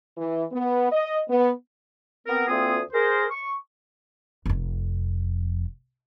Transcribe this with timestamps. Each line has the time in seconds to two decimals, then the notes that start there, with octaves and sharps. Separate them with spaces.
0.18 E3
0.52 B3
0.92 D#5
1.29 B3
2.27 B3 C4 A#4
2.48 D2 A#3 C4 F4 G#4 D#6
2.93 G#4 A#4 C5
3.31 C#6
4.46 F1 F2